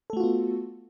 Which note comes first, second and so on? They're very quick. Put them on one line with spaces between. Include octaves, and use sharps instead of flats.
A4 A3 F#4 F4 B3